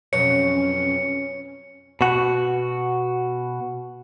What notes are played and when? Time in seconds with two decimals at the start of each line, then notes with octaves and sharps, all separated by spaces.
0.13 F2 B2 F#3 C#4 C#5 C#7
2.01 B2 F#4